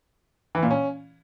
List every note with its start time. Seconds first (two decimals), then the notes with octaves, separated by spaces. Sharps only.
0.55 E3
0.63 A#2
0.71 C#4